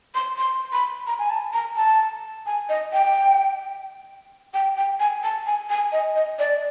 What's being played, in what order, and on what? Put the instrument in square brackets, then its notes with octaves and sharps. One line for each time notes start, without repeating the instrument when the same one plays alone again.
[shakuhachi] C6
C6
B5
A#5
G#5
A5
A#5
A5
G#5
D#5
G5
G5
G5
G#5
A5
G#5
G#5
D#5
D#5
D5